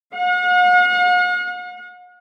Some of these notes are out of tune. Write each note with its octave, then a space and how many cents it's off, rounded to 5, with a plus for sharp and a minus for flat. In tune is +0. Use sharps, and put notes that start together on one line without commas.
F#5 -45